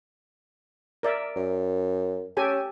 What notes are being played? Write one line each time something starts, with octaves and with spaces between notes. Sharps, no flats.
A#4 D5 E5
F#2
C#4 G4 A4 G#5